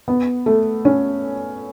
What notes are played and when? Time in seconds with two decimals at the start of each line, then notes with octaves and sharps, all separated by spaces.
0.08 B3
0.46 A3
0.85 C#4